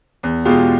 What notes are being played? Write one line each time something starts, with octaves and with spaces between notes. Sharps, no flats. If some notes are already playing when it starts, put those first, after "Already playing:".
E2
B2 G#3 F4 G4